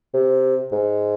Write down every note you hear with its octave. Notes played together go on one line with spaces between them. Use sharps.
C3
G#2